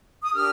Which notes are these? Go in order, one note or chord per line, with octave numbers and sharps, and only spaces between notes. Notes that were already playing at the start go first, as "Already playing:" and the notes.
D#6
D4 G4 A#4 F6